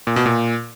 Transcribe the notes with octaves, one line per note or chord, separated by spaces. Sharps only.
A#2
B2
A#2